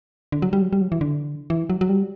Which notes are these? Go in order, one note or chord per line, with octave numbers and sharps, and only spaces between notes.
D3
F#3
G3
F#3
G3
F#3
E3
D3
E3
F#3
F#3
G3